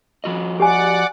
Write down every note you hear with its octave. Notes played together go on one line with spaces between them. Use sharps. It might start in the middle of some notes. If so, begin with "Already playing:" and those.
F3 F#4 D#5
G4 D5 F#5 G#5 D6